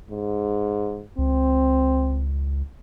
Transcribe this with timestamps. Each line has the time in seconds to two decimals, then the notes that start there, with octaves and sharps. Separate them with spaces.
0.10 G#2
1.18 C#2 C4